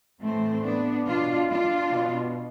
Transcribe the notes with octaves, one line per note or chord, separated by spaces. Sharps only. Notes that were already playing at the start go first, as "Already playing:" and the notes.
A2 E3 A3 C4
B3 D4
B2 D4 F4
D4 F4
B2